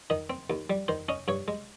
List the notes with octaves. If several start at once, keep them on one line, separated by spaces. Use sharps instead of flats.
D#3 D#5
C4
D#2
G3
D#3 C5
C#4 D#5
G2 C#5
G#3